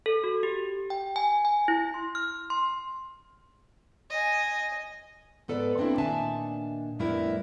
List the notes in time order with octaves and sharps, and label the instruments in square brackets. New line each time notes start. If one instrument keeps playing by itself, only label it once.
[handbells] A4
F#4
G4
G5
G#5
G#5
E4
C6
F6
C6
[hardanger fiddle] D#5 G#5
[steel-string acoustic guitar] G#2 B3 A4 B4 D5
A#3 C4 D4 E4
A#2 D#3 D4 E5 G#5 A5
F2 A2 G3 B3 E4 A#4